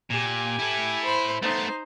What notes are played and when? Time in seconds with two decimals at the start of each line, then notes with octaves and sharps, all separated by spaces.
0.10 A#2 G4 G#5
0.59 E4 A4
1.04 C5 B5
1.42 A3 B3 D#4 C5